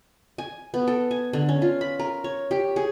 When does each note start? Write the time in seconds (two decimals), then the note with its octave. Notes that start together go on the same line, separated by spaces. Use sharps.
0.38 G#5
0.74 B3
0.88 A4
1.11 G#5
1.33 D3
1.49 C#4
1.62 F4
1.81 B5
1.99 A#4
2.24 C#5
2.51 G4
2.76 G#4